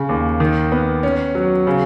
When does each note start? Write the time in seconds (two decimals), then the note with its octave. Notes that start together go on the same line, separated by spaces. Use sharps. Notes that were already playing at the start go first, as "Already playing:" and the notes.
Already playing: C#3
0.09 D#2
0.40 D#3
0.72 B3
1.03 C#4
1.35 F#3
1.67 C#3